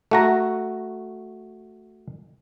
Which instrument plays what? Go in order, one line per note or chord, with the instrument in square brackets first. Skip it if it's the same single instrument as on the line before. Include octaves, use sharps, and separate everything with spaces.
[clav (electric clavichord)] A3 F#4 A#5